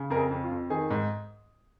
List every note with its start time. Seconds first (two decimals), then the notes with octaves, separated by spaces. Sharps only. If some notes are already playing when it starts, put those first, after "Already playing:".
Already playing: C#3
0.10 F2 A#4
0.17 G#4
0.31 F2
0.44 F4
0.51 F2
0.70 D#3 G#4
0.90 G#2